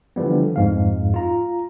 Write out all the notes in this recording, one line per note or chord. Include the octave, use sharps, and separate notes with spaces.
D3 E3 F3 G3 B3
F2 G#2 F5
F4 A#5